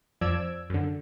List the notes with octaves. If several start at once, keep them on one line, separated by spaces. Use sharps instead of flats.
F2 F3 D5 E6 G#6 D7
F#2 D3